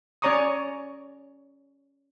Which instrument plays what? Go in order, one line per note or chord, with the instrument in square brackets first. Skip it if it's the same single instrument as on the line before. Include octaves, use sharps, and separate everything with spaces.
[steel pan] C#4 C#5 D5 A#5 C#6 D#6